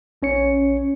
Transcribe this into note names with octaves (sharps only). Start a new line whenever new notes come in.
A#1 C#4 C#5 C#7